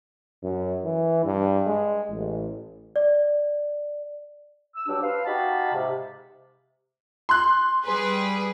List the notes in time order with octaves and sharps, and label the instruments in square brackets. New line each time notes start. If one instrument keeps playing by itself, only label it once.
[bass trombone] F#2
E3
G2
G#3
A1
[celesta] D5
[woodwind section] E6
G2 F#3 G3 D4 G4
B4 C5 F5
D#4 F#4 G4 F5 A5 B5
G#2 C3
[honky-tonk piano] C6 F#6
[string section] G3 G#4 B4